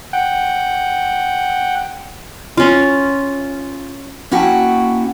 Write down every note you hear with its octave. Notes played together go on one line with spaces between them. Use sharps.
F#5 G5
C#4 F4
A#3 C#4 E4 F#4 G5 A5